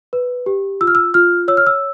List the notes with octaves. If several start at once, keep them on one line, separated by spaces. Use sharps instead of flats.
B4
G4
F4 E6
F6
E6
F4 F6
C#5 E6
F6
E6